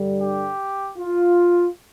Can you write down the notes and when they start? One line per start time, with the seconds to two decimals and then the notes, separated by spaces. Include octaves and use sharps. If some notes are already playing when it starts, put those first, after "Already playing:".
Already playing: G2 D3 G3
0.21 G4
0.98 F4